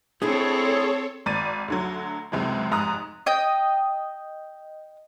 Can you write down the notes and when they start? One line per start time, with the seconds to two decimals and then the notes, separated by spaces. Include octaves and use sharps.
0.22 A3 C4 D4 E4 G#4 A4 C#5
1.26 G#1 D5 A6 D#7
1.68 D2 D3 F#3
2.32 C#2 F#2 C3 E3 G#3
2.71 F1 G#2 A#5 D#6 F#6
3.26 D#5 G5